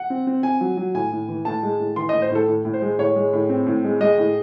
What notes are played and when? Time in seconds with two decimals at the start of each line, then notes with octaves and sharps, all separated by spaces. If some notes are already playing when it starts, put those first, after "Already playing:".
Already playing: F#5
0.10 C4
0.27 C4
0.43 C4 G#5
0.61 F#3
0.77 F#3
0.94 A2 G#5
1.12 A2
1.28 E3
1.45 A2 A5
1.63 G#3
1.80 A2
1.96 E3 C6
2.09 A2 D#5
2.22 C5
2.30 A2 A4
2.48 A2
2.65 A2
2.73 C5
2.82 G#3
2.98 A2 C#5
3.16 G#3
3.33 A2
3.49 C4
3.67 A2
3.84 G#3
4.00 G#3 D#5
4.18 A2